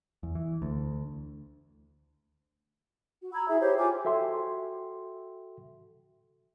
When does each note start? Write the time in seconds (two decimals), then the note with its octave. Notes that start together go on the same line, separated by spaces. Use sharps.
0.23 E2
0.35 E3
0.62 D2
3.22 F#4
3.33 A#5 B5 E6 G#6
3.48 E4 G#4 E5
3.61 G4 C5 C#5
3.78 F4 G5 G#5 D6
4.05 F#4 A4 E5 G5 C6